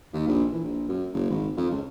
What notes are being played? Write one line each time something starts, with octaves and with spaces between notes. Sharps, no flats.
D#2
A#1
E3
A#1
F#2
F#1
G#1
F2
C#2